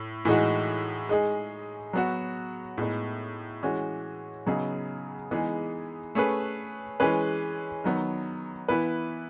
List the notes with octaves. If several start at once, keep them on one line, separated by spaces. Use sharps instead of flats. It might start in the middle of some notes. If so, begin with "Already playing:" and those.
Already playing: A2
A2 E3 G#3 D#4 F#4
G#3 D#4 G#4
F#3 B3 F#4
A2 G#3 B3 D#4
E3 G#3 C#4 F#4
C#3 F#3 B3 D#4 G#4
E3 G#3 B3 D#4 G#4
A3 C#4 G#4 B4
E3 G#3 C#4 G#4 B4
D#3 F#3 B3
E3 B3 E4 B4